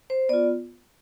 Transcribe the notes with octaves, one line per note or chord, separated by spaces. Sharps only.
C5
B3 F4 D5